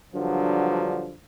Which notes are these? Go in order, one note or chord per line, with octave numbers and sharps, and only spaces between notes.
G2 D3 F3 F#3